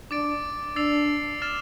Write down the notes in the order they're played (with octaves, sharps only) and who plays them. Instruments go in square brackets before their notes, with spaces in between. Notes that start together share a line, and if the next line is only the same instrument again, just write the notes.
[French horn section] D4 [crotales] D6 A6 D7
[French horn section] D4 [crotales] E6 A6 C7 F7
[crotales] D6 F6 A6 E7